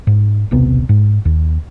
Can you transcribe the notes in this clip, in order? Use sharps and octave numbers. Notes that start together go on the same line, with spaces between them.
G#2
D#1 B1 C3 B3
G#2
D#2